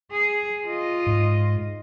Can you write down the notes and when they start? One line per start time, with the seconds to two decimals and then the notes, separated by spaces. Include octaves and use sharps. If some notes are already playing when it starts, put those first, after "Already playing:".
0.12 G#4
0.66 F4 D#5
1.07 G#2